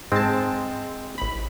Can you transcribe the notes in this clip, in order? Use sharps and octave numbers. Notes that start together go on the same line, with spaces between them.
G#2 G#3 C4 A5
A1 B5